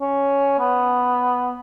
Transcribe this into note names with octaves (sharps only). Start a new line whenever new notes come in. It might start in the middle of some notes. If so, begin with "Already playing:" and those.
C#4
B3